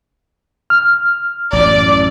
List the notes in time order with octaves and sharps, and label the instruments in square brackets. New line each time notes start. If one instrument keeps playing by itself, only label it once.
[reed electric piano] F6
[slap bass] A1 F#2 [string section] D5